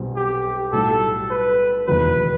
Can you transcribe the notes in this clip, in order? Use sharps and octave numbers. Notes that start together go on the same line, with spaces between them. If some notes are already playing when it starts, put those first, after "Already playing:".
Already playing: B1 B2 G3 C4 F#4
G4
B1 A2 G3 D#4 F#4 A4
B4
E1 E2 D#3 F#3 B4